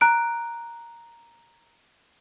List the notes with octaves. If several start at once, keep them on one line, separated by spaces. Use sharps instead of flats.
A#5 F#6 D7